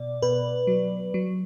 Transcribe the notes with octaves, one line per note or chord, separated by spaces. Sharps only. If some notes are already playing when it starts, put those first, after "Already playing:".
Already playing: B2 D5
B2 B4
F#3
F#3